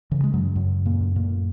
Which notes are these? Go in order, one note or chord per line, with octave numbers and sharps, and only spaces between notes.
C#3 E3
G#3
F#2 F#3
F#2
A#2 A#3
F#2
A#2 A#3